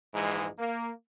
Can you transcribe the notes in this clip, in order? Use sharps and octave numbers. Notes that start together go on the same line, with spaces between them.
A#1 G#2 E3 G#3
A#3